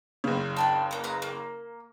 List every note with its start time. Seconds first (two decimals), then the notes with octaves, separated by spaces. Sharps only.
0.24 F#1 C#3
0.57 D4 G5 B5
0.91 A#3 B3
1.04 B4 F5 A#5
1.22 A#3